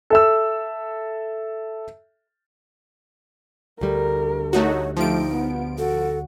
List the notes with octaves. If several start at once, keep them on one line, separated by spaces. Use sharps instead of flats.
A4 E5 E6
D2 G3 A4 A#4
A3 D#4 F#4 C#5
F3 A3 D#4 G4 D7
B3
F#4 A4